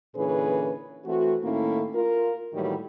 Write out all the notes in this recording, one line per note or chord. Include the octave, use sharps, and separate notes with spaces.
A#2 D3 E3 C#4 G#4 B4
E3 A3 C4 F#4
A2 D#3 A3 A#3 C#4 E4
F4 A#4
A2 D#3 E3 F#3 G3 A#3